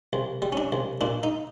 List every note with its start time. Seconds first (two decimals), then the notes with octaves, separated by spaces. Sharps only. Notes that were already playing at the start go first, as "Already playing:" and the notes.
0.13 C2
0.42 G3
0.52 C#4
0.57 D4
0.72 C2
1.01 A#2 D4
1.23 D#4